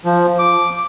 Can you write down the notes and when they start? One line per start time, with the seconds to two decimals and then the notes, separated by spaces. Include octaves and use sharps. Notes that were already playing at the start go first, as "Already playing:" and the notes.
0.05 F3
0.39 D6